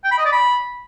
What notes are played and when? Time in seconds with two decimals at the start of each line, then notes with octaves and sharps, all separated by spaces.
0.04 G5
0.11 B5
0.18 D#5
0.25 D5
0.32 B5